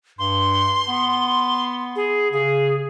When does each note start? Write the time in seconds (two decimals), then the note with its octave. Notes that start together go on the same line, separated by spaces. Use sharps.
0.19 G2 C6
0.89 B3
1.96 G#4
2.32 C#3 G#4